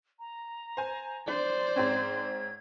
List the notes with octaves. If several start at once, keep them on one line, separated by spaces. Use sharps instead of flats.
A#5
C5 G#5
D4 C5 D5
G#2 C4 C#4 G#6